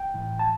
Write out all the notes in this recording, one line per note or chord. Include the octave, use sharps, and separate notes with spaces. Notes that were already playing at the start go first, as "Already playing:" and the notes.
Already playing: G5
A1 A2 E3
A5